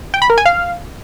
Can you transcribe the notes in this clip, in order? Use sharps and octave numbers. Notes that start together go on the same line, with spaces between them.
G5
B5
A#4
G#5
F5